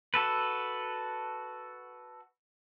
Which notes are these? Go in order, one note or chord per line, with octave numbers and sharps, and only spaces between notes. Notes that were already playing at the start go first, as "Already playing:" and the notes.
F#4 A4 B4